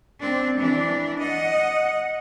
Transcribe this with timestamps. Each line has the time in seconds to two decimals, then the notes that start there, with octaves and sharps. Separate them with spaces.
0.19 C4 D4
0.58 E3 D4
1.19 D#5 F#5